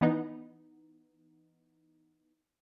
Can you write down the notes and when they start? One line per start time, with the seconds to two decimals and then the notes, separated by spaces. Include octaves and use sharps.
0.01 E3 B3 D#4